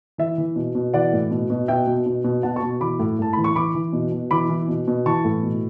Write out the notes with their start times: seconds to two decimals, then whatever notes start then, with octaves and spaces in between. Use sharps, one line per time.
0.18 E3 E5
0.38 E3
0.56 B2
0.75 B2
0.94 E3 D5 F#5
1.13 A2
1.31 B2
1.50 B2
1.68 B2 E5 G5
1.87 B2
2.06 B2
2.24 B2
2.43 B2 F#5 A5
2.56 A5 C#6
2.63 B2
2.81 E3 B5 D6
2.99 A2
3.19 A2 A5
3.33 E3 B5
3.44 C#6
3.56 E3 B5 D6
3.75 E3
3.93 B2
4.12 B2
4.31 E3 B5 D6
4.50 E3
4.68 B2
4.88 B2
5.06 E3 A5 C#6
5.24 A2
5.43 B2